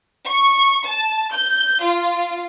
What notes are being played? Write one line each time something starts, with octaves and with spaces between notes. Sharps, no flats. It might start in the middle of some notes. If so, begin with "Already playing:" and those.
C#6
A5
G6
F4